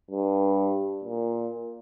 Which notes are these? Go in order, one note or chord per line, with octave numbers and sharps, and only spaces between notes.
G2
A#2